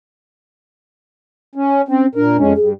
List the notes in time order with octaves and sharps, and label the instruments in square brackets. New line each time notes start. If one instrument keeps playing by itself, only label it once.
[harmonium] C#4
[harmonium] C4 [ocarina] C#4
[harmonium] A#2 A#4 [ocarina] D4
[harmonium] F2 G#3 C#4
[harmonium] G2 [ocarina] G#4